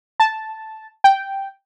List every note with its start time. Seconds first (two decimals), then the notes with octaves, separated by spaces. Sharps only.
0.20 A5
1.04 G5